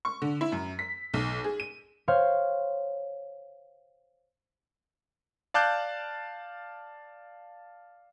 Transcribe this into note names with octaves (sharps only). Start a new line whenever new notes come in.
C#6
D3
E4
F#2
B6
B1
G#4
D#7
C5 C#5 F5
D5 F5 A5 D6 F#6 G6